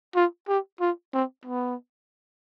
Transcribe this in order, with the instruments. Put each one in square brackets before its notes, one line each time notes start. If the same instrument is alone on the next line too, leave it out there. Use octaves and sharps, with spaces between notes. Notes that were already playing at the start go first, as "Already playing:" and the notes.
[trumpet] F4
G4
F4
C4
B3